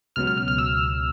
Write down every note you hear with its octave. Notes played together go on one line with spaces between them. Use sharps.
C#2 B2 F#3 F6
F6
F6
F6
E6